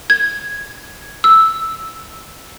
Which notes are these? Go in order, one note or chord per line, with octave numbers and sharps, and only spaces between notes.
G#6
E6